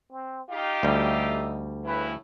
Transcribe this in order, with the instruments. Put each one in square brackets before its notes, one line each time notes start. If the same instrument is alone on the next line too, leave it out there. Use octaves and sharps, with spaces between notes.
[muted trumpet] C4
[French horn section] D#4 F4 G4 [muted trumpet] F5
[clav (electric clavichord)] D2 G3 [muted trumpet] E5
[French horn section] A2 C#3 E4 [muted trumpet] B4